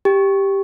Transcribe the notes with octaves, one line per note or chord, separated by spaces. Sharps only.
G4